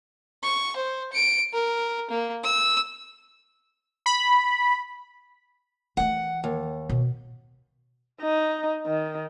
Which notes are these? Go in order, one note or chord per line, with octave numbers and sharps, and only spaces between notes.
C#6
C5
C#7 D7
A#4
A#3
E6
B5
E3 A3 F#5
D#2
B2
D#4
D#3